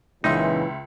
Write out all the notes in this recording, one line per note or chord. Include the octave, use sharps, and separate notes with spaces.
C#2 A#2 C#3 E3 D#4 E5 C6